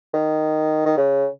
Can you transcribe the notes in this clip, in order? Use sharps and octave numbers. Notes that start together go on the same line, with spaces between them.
D#3
D#3
C#3